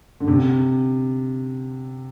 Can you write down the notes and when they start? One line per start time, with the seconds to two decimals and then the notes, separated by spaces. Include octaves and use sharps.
0.20 D3
0.28 C3